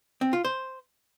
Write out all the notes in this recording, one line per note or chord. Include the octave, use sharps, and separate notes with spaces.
C4
F4
C5